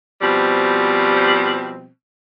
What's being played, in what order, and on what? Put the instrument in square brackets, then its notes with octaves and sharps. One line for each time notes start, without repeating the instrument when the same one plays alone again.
[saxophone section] B2 F3 G3 C4